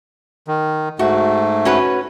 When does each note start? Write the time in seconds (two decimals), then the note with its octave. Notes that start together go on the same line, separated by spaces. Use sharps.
0.48 D#3
0.99 G#2 A3 F#4
1.65 C#4 F#4 B4